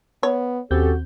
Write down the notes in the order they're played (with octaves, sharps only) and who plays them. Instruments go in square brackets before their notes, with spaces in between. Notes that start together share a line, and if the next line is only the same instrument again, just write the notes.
[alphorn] B3 [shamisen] C#5
[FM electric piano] D#2 C4 G6 [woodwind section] C#4 G4 A4 [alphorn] F#4